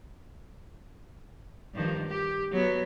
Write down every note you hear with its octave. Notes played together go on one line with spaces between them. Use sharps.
G2 D#3 F3
G4
F#3 B3